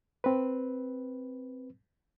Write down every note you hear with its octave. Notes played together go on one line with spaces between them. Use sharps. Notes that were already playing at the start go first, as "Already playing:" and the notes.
C4 B4